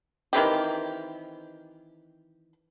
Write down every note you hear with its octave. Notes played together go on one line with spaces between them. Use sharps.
D#3 E3 C4 G4